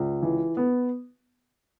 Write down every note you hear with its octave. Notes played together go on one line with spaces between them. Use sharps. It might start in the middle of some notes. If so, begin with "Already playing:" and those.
Already playing: C#2
E3
B3